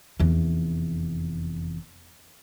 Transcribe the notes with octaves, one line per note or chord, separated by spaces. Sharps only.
F1 E2